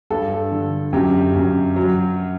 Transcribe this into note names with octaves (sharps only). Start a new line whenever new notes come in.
G2 A4
D3
F#2 G4
F#2
F#3